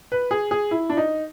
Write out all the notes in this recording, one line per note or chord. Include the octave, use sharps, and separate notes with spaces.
B4
G#4
G#4
E4
D4
D#4